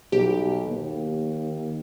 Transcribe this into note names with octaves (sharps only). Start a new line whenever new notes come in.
B1 G4
D#2